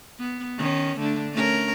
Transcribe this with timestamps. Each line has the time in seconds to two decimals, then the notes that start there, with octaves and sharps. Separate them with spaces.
0.19 B3
0.58 D#3 C#4
0.98 D3 A3 D4
1.32 A3 C#4 A#4